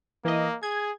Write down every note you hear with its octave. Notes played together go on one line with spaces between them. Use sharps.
E3 A#3 D#5
G#4 G#6